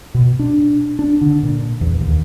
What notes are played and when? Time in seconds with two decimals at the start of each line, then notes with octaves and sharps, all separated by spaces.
0.14 B2
0.39 D4
0.99 D4
1.21 D3
1.43 A#2
1.81 E2
2.01 D#2